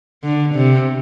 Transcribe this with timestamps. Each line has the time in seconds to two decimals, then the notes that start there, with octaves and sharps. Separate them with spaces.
0.23 D3
0.55 C3